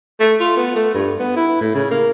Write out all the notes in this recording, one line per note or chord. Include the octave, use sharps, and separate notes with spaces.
A3
F4
B3
A3
G2
B3
E4
A2
C#3
A#3